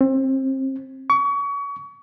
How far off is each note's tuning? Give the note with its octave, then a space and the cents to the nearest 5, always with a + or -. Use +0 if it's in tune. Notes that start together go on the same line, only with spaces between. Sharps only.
C4 +30
C#6 +30